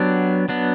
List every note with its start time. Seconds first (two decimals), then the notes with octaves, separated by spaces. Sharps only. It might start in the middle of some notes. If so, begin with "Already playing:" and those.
Already playing: F#3 B3 D4 G4
0.49 F#3 B3 D4